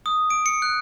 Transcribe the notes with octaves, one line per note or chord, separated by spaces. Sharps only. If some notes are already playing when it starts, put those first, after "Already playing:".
D#6
D7
C#7
F#6